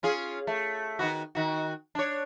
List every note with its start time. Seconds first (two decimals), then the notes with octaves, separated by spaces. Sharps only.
0.03 C#4 F4 G#4
0.47 A3
0.99 D#3 B3 F#4
1.35 D#3 F#4
1.95 D4 C#5